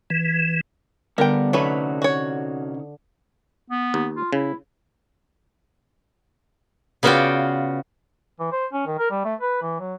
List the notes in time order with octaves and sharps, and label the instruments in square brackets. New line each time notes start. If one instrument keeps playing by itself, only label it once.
[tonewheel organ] E3
[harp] D3 [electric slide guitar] G3 B3 [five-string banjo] A#4 G5
[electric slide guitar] C3 C#4 D#4 [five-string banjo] F#3 A3 B4
[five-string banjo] F#4 C#5
[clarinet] B3
[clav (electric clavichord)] D#2
[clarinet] F4
[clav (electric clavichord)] C#3 [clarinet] E4
[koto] C#3 B3 F4 F#4 D5 G5
[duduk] E3
C5
C#4
D#3
A#4
G3
A3
B4
E3
F#3